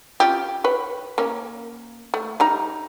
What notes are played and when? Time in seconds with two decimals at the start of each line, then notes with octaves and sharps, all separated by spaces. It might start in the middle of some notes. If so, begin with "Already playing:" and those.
0.20 C#4 F4 G4
0.64 B4 C#5
1.18 A#3 C#4
2.14 A3
2.40 G3 D#4 A#5